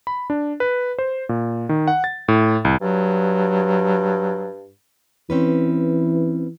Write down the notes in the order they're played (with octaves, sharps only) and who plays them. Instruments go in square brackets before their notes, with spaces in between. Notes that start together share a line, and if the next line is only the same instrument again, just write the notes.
[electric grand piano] B5
D4
B4
C5
A#2
D#3
F#5
A6
A2
C2
[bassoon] G2 [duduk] F#3
[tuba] E3 [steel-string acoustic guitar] C4 C#4 B4